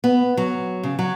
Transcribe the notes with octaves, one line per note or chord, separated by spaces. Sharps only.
B3
F#3
C#3
F#3